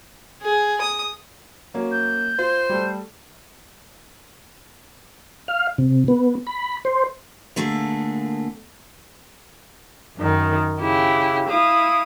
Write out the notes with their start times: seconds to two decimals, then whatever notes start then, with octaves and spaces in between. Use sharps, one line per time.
0.42 G#4
0.81 D#6
1.74 F#3 A#3 C#4
1.91 G6
2.39 F4 C5
2.69 G3 A3
5.48 F5
5.78 C3
6.08 B3
6.47 B5
6.85 C5
7.56 A#2 D3 A3 A#3 G#4
10.17 F#2 D#3
10.79 C#3 E4 G4
11.49 E4 F5 D#6